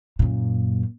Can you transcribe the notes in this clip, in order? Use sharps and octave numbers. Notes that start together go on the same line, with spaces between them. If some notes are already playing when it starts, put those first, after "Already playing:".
F#2 A#2